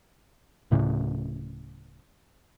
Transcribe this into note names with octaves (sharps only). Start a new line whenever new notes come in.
D1 A2 C#3